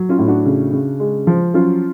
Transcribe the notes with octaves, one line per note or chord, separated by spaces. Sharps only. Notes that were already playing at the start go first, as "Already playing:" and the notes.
Already playing: F#3
C#4 F4
A2
D4 F#4
C#3
C#3
G#3
F3
F#3 C#4 F4